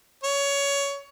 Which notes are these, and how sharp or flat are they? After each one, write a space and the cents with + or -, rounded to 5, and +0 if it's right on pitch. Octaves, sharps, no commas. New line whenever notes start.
C#5 +20